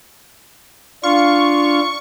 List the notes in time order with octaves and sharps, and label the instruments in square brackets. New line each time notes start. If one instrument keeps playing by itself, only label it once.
[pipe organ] D4 [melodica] F4 F5 [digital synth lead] C#6